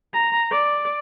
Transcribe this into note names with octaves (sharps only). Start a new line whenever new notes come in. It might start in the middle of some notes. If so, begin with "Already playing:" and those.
A#5
D5